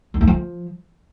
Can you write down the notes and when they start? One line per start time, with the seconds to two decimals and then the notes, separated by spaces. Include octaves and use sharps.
0.14 G#3
0.21 A3
0.27 F3